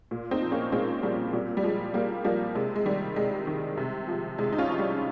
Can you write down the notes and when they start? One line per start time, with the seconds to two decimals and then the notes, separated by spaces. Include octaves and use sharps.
0.11 A#2
0.31 C4 D#4
0.42 F3
0.51 A#3 C#4
0.72 A#2 G#3 C4
1.02 F3 G3 A#3
1.33 A#2 G3
1.57 G3
1.63 F3 G#3
1.94 A#2 G3 A#3
2.24 F3 G3 A#3
2.55 C3 G#3
2.76 G#3
2.86 D#3 G3
3.16 C3 G#3
3.47 D#3
3.77 C3
4.08 F3
4.38 C3 G#3
4.52 D#4
4.58 C#4 F4
4.69 F3
4.79 G3